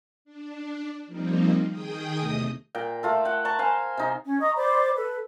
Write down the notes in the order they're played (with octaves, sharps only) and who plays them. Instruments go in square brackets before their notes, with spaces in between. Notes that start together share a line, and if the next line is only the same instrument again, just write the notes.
[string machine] D4
F3 G3 A#3 C4 D#4
D#3 G#4 G5 D#6
E2 C3 A3 D#5 D#6
[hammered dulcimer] A#2 G5
A3 F4 A4
F#5 G5
A5 A#5 C#6
C5 F5 G#5
C3 D#4
[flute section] C#4
D#5 A#5 C#6 D#6
C5 D5 B5 D6
A4 B4